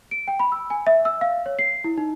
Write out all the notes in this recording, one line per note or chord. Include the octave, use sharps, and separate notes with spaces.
D7
G5
B5
E6
G#5
E5
E6
F5
C#5
C7
E4
D#4